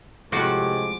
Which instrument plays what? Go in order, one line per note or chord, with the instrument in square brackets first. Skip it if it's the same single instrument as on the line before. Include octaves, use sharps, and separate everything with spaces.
[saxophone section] A2 C3 [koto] F3 F#4 [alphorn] G#3 [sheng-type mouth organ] D6